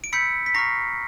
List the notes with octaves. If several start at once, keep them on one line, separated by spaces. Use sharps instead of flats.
D7
B5 E6 G6 B6 C#7
B6
A#5 C#6 F6 A#6 C7